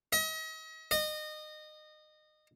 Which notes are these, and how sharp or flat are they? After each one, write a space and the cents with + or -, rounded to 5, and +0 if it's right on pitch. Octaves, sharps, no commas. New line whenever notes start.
D#5 +40
D#5 -25